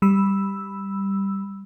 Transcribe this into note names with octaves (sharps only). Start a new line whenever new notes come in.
G3 B5 E6